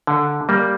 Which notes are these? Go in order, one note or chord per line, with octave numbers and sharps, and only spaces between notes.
D3
G3 A#3